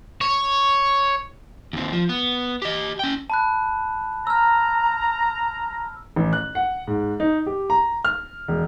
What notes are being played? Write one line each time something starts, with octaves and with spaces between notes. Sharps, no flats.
C#5
D#2 C4
F3
B3
G4 D#5
C#4 G5
A5 B5 F#6
A#5 E6 F6
A1
F#6
F#5
G#2
D#4
G4
A#5
F6
E1